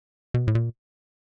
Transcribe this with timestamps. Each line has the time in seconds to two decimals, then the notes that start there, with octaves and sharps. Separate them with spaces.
0.34 B2
0.48 A2
0.55 A#2